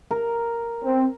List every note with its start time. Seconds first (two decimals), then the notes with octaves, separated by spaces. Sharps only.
0.11 A#4
0.83 C4